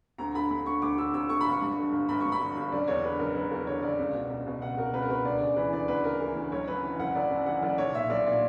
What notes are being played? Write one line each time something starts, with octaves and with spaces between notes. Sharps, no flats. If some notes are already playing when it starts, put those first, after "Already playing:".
D2 A#5
D3 B5
D2 B5
D3 C#6
D2 D6
D3 E6
D2 E6
D3 C#6
B5
G1
C#6
G2
D3
G1
G1 B5
G2 C#6
B5
D3
G1
F#1 D5
E2 C#5
D3 B4
F#1 A#4
F#1 B4
E2 A#4
D3 C#5
F#1 D5
C#2
B2
C#2
B2
C#2 F#5
B2 A#4
C#2 B4
A#4
B2 B4
D2 D5
C#3 D5
E3 B4
D2 D5
D2 B4
C#3 A#4
E3 A#4
D2
F#1 C#5
F#2 B4
E3
F#1 F#5
F#1 D5
F#2
E3 F#5
F#1 D5
B1 C#5
A#2 E5
B1 D5
A#2 D5